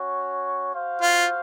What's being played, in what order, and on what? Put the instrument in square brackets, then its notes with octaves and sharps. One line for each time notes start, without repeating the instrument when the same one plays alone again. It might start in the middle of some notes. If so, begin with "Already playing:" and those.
Already playing: [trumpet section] C#4 F#4 C#5
F#4 C5 F5
[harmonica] F4